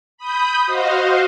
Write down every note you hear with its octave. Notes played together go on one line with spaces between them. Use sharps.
B5 D#6 G6
F#4 C5 D#5 F5